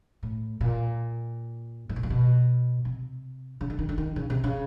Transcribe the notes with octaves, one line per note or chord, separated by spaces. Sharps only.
A2
A#2
G#2
A2
A#2
B2
C3
C#3
D3
D#3
D3
D#3
C#3
C3
C#3